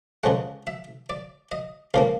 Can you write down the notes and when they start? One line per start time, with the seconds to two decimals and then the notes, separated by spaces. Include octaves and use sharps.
0.24 C#2 C#3 F3 G#3 F#5
0.67 E5
1.10 D5
1.52 D#5
1.94 C#2 C#3 F3 A#3 F5